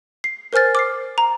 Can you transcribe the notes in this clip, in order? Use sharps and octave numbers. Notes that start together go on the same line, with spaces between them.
C7
A#4 C5 G#5 F6 A6
D6 F6 C7
A#5